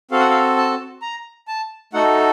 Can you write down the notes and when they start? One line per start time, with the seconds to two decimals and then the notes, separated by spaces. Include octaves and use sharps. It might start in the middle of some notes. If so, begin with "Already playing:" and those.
0.11 C4 F#4 A4 F5
0.20 F#5
0.30 F5
0.57 A5
1.02 A#5
1.48 A5
1.93 A3 D#4 F#4 A4 F#5